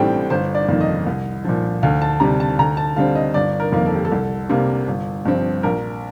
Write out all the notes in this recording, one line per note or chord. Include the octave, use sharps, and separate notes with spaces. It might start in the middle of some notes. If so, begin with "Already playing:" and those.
Already playing: A1 A2 G3 C4 G5
G1 C5
D5
F2 D#3 A#3
D#5
C2
A#2 F3
D2 F5
A5
C3 G3 A#5
A5
D2 A#5
A5
D3 G3 C4 F5
D#5
G1 D5
A#4
F2 D#3 A#3
A4
G4
A4
C2
C3 G3 A#3
G1
G2 F3 C4
A#1 A#4